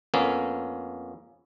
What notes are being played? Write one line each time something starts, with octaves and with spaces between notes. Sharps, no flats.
F2 A#3 B3 C#4